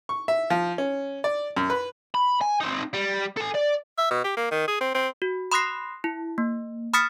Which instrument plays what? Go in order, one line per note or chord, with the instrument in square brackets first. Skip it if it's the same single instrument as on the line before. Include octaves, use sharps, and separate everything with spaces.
[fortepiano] C#6
E5
F3
C#4
D5
F#2
B4
[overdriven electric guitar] B5
G#5
C4 D#4
G3
A4 G#5
D5
[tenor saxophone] E5
B2
G4
A#3
D#3
G#4
C4
C4
[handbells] F#4
B5 C6 D#6 F#6 A#6 C7
E4
A#3
B5 D#6 F6 A6 B6 C#7